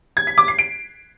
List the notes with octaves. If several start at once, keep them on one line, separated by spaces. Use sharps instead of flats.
G#6
B6
D6
C7
D7